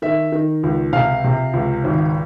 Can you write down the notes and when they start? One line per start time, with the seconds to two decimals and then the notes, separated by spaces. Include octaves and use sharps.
0.02 D#3 E5
0.32 D#3
0.63 C#2
0.93 C3 F5
1.24 C3
1.53 C#2
1.84 G#1